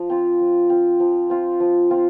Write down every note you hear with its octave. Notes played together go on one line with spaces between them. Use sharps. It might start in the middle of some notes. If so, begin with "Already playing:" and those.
Already playing: F3
C4 F4
F3
C4 F4
F3
C4 F4
F3
C4 F4